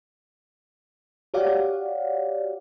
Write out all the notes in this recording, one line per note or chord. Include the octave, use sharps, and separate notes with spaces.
F#4 G4 C#5 D5 F5 F#5